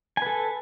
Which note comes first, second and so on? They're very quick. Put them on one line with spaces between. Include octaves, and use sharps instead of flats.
G#5 B4 A4